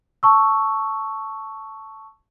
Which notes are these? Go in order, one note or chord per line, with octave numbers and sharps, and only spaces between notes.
A5 C#6 E6